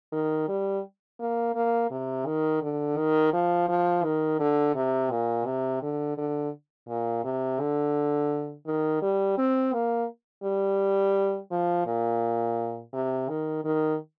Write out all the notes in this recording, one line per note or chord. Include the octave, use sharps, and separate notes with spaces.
D#3
G3
A#3
A#3
C3
D#3
D3
D#3
F3
F3
D#3
D3
C3
A#2
C3
D3
D3
A#2
C3
D3
D#3
G3
C4
A#3
G3
F3
A#2
C3
D#3
D#3